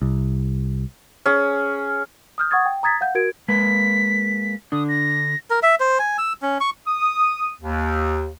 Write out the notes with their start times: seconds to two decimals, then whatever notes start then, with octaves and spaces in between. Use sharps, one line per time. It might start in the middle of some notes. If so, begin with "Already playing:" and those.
0.02 C2
1.26 C#4 G#4
2.38 D#6 F6 G6
2.51 F#5 C#6 D#6 G#6 A6
2.66 G5
2.83 A#5 D#6 G#6 A6 B6
3.01 F5 F#5 G6
3.15 F#4 A#4 G#6 D7
3.48 G#3 A#3 B4 B6
4.72 D3 D4 D#6
4.89 A#6
5.50 A#4
5.63 E5
5.80 C5
5.99 G#5
6.18 E6
6.42 C#4
6.61 C#6
6.87 D#6
7.62 D#2